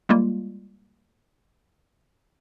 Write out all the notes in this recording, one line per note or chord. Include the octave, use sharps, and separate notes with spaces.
G3 G#3 A#3 F4